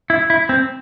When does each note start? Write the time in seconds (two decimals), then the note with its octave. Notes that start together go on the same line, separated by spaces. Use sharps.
0.10 E4
0.30 E4
0.49 C4